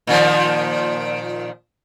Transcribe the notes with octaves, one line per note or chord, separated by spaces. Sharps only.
A#2 D#3 F3